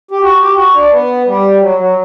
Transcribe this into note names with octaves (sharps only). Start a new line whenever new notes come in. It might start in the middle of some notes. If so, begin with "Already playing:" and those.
G4
F#4
G4
F#4
D4
B3
G3
F#3
F#3